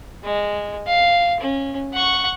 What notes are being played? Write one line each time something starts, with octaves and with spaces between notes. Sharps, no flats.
G#3
F5
C#4
F#5 C#6